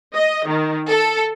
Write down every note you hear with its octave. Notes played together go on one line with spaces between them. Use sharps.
D#5
D#3
A4